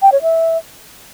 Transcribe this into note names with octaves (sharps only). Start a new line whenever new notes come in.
G5
C#5
E5